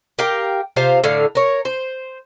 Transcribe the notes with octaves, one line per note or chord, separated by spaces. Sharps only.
G4 A#4 F5 G5
C3 F4 C5 F5
A2 D3 F5
A#4 C#5
C5